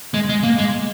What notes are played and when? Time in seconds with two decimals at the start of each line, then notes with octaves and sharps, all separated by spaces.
0.14 G#3
0.29 G#3
0.43 A#3
0.59 G#3